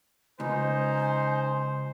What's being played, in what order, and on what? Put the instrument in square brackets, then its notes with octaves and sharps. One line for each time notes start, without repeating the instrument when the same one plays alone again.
[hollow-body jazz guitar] C#2 [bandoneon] D#4 [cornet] C5 [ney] G#5